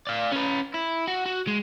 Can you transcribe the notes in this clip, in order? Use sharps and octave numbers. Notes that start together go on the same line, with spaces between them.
D5 F5
C#4 B4
E4
F#4
F#4
G#3